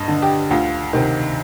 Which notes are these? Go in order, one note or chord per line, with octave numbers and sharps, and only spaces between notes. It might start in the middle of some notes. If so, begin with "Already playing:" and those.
Already playing: G2 D#5
D3
G4
D2 F4
C3 D#3